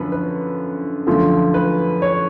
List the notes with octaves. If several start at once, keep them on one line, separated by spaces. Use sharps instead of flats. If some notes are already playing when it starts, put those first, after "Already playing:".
Already playing: F#2 D3 F3 B4
B4
F#2 D3 F3 A3
B4
C#5